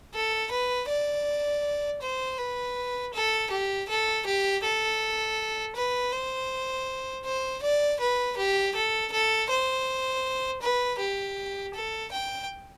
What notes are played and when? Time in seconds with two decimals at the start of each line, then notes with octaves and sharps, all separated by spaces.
0.14 A4
0.51 B4
0.89 D5
2.02 C5
2.39 B4
3.14 A4
3.51 G4
3.88 A4
4.26 G4
4.63 A4
5.75 B4
6.13 C5
7.25 C5
7.63 D5
8.00 B4
8.38 G4
8.75 A4
9.12 A4
9.50 C5
10.62 B4
10.99 G4
11.74 A4
12.12 G5